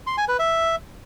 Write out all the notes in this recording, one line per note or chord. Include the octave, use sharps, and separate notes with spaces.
C6
G#5
B4
E5